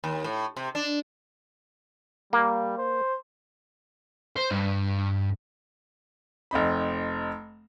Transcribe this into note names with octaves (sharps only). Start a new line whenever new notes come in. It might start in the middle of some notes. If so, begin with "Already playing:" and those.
D#2
A2
C3
D4
G3 A#3
C5
C5
G2
F1 C4 D#4 B5